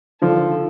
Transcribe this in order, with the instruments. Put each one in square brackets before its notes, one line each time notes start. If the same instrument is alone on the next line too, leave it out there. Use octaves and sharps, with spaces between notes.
[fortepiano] D3 F3 [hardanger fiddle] A4